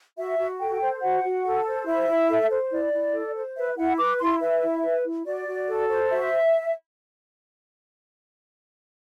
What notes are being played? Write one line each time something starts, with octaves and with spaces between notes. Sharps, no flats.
F#4 E5
F#4
A4 G5
C5
F#4 F#5
F#4
A4
C5
E4 E5
E4
A4
C5
E4 D5
E4
A4
C5
B4 E5
E4 F#5
B4 D6
E4 C6
B4 E5
E4
B4
E4
F#4 D5
F#4
A4
C5
F#4 E5